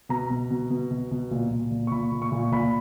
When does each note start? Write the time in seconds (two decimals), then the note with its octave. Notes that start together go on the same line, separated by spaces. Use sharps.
0.09 B2 A#5
0.30 B2
0.51 B2
0.70 B2
0.91 B2
1.11 B2
1.31 A#2
1.51 A#2
1.71 A#2
1.87 C#6
1.91 A#2 B5
2.12 A#2
2.22 C#6
2.32 A#2
2.52 A#2 B5